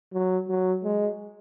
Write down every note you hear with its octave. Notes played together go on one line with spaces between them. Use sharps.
F#3
F#3
G#3